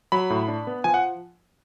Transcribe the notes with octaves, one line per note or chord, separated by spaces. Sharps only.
F#3 B5
A2
D4
B3
F3 G#5
F#5